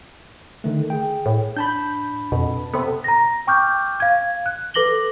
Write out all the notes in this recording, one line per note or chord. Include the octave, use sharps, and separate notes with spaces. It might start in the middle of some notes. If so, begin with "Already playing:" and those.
D3 D#3 A3
G#4 G5
A2
D4 A5 B5 G6
F2 B2
C3 B3 A4
A#5 A#6
G5 C#6 D6 F6 G6
F5 G#6
F#6
A4 B4 D6 A#6 F#7 G7